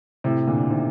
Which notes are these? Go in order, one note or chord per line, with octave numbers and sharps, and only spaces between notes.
A2 C3
A#2 D3
C3 D#3